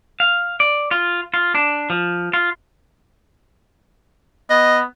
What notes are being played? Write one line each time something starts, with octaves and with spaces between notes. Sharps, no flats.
F5
D5
F4
F4
D4
F3
F4
B3 D#5